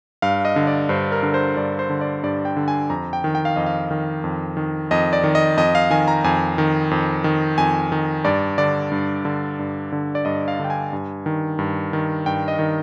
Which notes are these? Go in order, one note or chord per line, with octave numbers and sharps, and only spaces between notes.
G2 F5
D#5
D3
D5
G2 C5
A#4
D3
C5
G2 D5
C5
D3
D5
G2 D5
G5
D3
G#5
F2 A#5
G5
D#3
G5
F5
F2 D#5
F5
D#3
F2
D#3
F2 D#5
D5
D#3
D#5
F2 D#5
F5
D#3 G#5
A#5
F2 G#5
D#3
F2
D#3
F2 G#5
D#3
G2 D5
D3 D5
G2
D3
G2
D3
D5
G2 D#5
F5
D3 G5
G#5
G2
D#3
G2
D#3
G2 G5
D#5
D#3